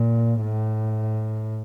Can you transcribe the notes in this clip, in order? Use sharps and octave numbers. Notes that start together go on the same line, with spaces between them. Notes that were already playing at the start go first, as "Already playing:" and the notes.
Already playing: A#2
A2